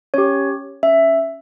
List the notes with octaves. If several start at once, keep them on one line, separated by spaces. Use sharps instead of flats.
C#4 G4 C#5
C#4 E5